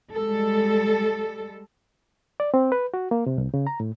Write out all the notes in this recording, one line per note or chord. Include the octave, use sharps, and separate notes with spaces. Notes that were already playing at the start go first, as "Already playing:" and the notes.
G3 G#3 A4
D5
C4
B4
F#4
A#3
C3
C2
C#3
A#5
A2